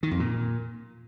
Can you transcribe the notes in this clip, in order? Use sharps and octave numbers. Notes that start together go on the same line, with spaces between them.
D#3
F2
A#2